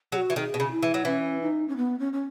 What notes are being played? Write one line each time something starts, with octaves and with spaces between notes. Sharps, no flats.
F#3 G#4
F#4
E3
D#3 A4
G#4
B2
C#3
E4
E3
F#3
E3 C#4
D#4
C#4
B3
C#4
C#4